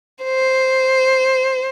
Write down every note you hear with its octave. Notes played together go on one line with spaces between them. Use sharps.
C5